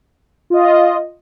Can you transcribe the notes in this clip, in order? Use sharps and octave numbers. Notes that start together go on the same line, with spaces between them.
F4 D#5